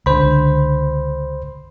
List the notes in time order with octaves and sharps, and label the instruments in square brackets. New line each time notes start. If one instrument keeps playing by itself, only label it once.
[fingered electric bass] C#2 D3 [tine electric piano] C5 B5